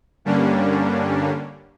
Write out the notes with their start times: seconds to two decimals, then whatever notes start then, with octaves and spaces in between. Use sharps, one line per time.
0.25 G2 D3 G3 A#3 C#4 D4